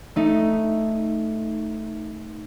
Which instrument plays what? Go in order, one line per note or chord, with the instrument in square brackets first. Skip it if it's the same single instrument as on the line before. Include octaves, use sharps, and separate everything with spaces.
[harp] A3 D#4